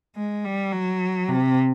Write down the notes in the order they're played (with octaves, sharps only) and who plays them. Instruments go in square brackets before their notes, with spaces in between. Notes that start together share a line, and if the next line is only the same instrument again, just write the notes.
[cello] G#3
G3
F#3
C3